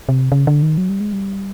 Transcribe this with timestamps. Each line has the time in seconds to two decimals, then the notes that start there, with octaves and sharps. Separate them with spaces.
0.09 C3
0.32 C#3
0.47 D3
0.62 D#3
0.78 F#3
0.89 G3
1.01 G#3
1.13 G3